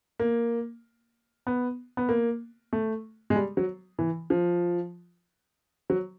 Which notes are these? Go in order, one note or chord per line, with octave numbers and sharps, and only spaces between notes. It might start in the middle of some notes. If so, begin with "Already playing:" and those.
A#3
B3
B3
A#3
A3
G#3
G3
F#3
E3
F3
F#3